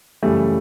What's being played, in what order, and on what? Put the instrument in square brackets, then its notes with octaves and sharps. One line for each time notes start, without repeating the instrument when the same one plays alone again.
[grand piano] F#2 C#3 E3 G3 A3